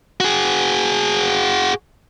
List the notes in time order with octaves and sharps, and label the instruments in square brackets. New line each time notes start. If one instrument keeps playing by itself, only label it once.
[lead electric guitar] F#4 G#4